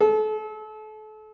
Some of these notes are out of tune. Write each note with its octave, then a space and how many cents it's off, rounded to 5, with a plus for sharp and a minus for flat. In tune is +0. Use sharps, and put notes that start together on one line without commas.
A4 -35